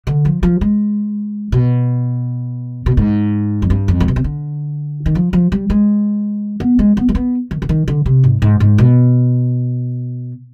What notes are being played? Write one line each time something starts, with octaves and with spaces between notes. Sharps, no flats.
D3
F3
F3
G#3
B2
B2
G#2
F2
G2
F2
G#2
B2
C3
D3
D#3
F3
F3
G3
G#3
B3
G#3
B3
G#3
B3
D#3
D3
D#3
D3
C3
G#2
G#2
G#2
B2